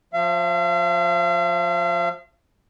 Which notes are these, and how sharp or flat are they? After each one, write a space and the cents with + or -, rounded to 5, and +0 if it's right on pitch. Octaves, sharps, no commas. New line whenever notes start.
F3 +25 F5 -45